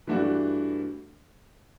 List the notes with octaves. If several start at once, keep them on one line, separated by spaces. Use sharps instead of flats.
G2 E3 A3 D4 F#4